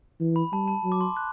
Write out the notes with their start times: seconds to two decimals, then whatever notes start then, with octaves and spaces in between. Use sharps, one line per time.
0.20 E3
0.36 B5
0.53 G3 A5
0.68 A5
0.84 F#3
0.92 D6
1.01 C6
1.17 F#6